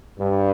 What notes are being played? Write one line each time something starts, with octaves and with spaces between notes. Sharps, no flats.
G2